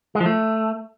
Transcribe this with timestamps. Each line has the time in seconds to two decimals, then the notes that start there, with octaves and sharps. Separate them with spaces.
0.15 G#3
0.20 F3
0.26 A3